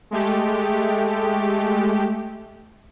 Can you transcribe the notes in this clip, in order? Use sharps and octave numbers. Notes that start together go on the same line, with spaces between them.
G#3 A3 G4